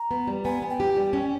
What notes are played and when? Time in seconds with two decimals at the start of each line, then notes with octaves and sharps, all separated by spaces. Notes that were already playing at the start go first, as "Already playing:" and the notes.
Already playing: A#5
0.11 B3
0.27 G3
0.45 B3 G#5
0.62 B3
0.70 G5
0.80 G4
0.97 G3
1.13 C#4